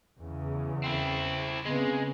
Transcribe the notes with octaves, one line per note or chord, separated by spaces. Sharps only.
E2 C#3
C4 E4
C#3 G#3 B3 C4 B4